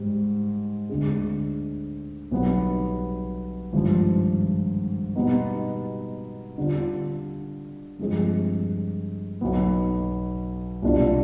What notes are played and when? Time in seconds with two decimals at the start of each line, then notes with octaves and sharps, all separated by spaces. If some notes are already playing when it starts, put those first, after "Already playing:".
Already playing: G#2 G3
0.90 D2 D3 G#3
2.31 B1 B2 G3 B3
3.73 G#1 G2 F3
5.16 B2 G3 B3 D#4
6.58 D3 G3 D4 F4
7.99 G2 F3 G#3 C4
9.41 B1 B2 B3
10.82 C2 B2 G3 D4 F4